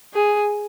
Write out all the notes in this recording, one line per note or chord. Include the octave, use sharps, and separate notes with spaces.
G#4